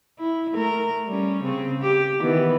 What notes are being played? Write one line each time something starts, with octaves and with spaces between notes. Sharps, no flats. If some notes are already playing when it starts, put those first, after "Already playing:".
E4
A3 A#4
G3 C#4
C#3 C4
G4
D#3 E3 B3